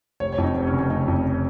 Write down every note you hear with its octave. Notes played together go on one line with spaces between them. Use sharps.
F1 C#5
C#5
F2
D#4
F1
C#4
C#3
C#4
F1 D#4
F2